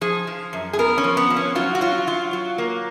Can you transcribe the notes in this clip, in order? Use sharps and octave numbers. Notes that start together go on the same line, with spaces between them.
F3 G#4
F3
F#2
G#4
B3 A#4
C#4
F3
B3
F3
C#4
F#3 F4
F#4
F#3 F4
F#3 F4
F#3
A#3